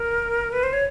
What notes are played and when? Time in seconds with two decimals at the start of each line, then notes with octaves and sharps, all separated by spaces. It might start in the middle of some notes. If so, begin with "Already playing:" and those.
Already playing: A#4
0.52 B4
0.63 C5
0.73 C#5